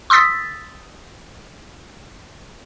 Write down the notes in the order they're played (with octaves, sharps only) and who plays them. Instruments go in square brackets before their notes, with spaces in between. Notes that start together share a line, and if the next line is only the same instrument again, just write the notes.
[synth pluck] C6 D#6 E6 A6 B6